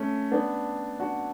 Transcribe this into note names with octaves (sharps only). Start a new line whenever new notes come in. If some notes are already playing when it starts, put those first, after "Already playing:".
Already playing: A3 C#4
B3 D4
D4 F#4